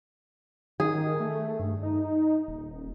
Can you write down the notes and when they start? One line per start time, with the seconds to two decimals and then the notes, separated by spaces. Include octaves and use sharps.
0.80 D#3 G#4
1.20 A3
1.59 G2
1.83 D#4
2.48 D#1